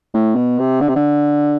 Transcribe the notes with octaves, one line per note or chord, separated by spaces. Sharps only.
A2
B2
C3
D3
C3
D3